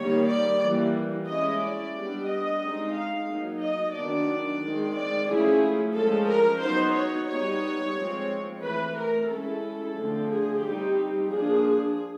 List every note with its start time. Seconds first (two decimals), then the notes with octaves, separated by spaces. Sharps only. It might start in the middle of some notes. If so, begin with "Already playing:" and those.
Already playing: D#3 G3 A#3 C#5
0.27 D5
0.60 E3 G3 A#3
1.26 G#3 C#4 E4 D#5
1.60 D5
1.94 G3 B3 D4
2.27 D#5
2.61 G#3 C4 D#4
2.94 F5
3.27 F#3 A#3 D#4
3.60 D#5
3.94 D#3 F#3 B3 D4 D5
4.61 D#3 G#3 C4
4.95 D5
5.28 F3 A3 C#4 E4 G#4
5.94 F3 G#3 C#4 A4
6.27 A#4
6.61 F#3 B3 D#4 C5
6.94 C#5
7.28 G3 B3 D#4 C#5
7.95 F3 G#3 C4
8.61 E3 A3 C4 B4
8.95 A#4
9.28 G#3 C#4 E4 A4
9.95 D3 F3 A3 C4
10.29 G#4
10.62 G3 C4 D#4 G4
11.28 F3 A#3 D4 G#4